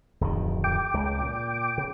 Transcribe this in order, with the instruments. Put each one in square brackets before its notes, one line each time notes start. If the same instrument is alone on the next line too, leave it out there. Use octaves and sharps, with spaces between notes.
[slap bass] D1 F2 D#3
[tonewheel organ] G5 D6
[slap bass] C#2 C#3
A#2
C#3